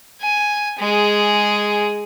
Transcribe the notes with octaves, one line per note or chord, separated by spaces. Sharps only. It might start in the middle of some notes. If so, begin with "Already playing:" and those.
G#5
G#3 G#4